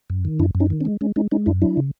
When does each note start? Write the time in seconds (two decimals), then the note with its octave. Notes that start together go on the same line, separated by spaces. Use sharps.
0.10 F#2
0.25 D#3
0.39 F#2 D4 E4
0.55 F#2
0.60 C#4 D#4
0.70 D#3
0.80 C4 D4
0.85 G#3
1.01 G#3 C#4
1.16 G#3 C#4 D#4
1.31 G#3 C#4 D#4
1.46 F#2 D4 E4
1.62 F#3 D4 E4
1.77 C#3